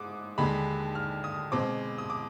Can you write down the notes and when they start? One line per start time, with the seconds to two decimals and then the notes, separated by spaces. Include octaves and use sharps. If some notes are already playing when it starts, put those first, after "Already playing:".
Already playing: G#2 D6 D#6
0.38 D#2 D3 G#3 B5
0.95 F6
1.24 D#6
1.52 B2 G#3 C4 D6
1.98 D#6
2.10 D6